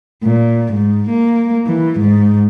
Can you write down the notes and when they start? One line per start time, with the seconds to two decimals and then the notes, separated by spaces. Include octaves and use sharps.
0.23 A#2
0.73 G#2
1.10 A#3
1.67 E3
2.00 G#2